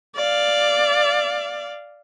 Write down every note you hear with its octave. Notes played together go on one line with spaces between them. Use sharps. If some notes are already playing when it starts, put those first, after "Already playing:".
D5 F5